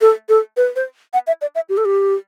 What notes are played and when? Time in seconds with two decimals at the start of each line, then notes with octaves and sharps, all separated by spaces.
0.01 A4
0.29 A4
0.57 B4
0.76 C5
1.13 F#5
1.27 E5
1.41 D5
1.55 E5
1.69 G4
1.77 A4
1.85 G4